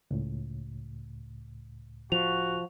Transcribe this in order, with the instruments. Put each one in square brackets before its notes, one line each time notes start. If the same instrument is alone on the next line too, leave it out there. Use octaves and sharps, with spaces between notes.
[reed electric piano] C#2 A2
[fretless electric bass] F3 [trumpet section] F#4 [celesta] F7